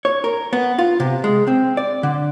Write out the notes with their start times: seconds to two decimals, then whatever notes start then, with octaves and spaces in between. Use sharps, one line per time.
0.05 C#5
0.24 A#4
0.53 B3
0.79 F4
1.00 C3
1.24 G#3
1.48 C4
1.77 D5
2.03 D3